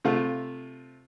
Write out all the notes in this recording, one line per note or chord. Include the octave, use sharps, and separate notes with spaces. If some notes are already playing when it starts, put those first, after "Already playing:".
C3 A3 F4